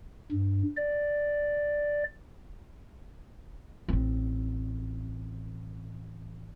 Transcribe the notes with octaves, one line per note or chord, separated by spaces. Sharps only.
G2
D5
A1 C4